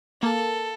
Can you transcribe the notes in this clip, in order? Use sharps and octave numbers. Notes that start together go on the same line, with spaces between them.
A#3 A4